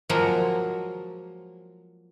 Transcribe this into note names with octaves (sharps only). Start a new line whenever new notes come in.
F3 F#3 G#3 A#3 F#4